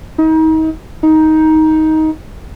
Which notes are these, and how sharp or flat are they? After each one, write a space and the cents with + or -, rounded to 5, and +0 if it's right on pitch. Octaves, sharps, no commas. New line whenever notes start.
D#4 +35
D#4 +15